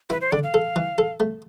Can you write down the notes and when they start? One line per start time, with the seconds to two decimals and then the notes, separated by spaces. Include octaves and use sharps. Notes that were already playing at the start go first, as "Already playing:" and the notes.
0.10 E4 B4
0.21 C5
0.32 D3 D5
0.43 F5
0.54 A4
0.76 E3
0.98 A4
1.20 A3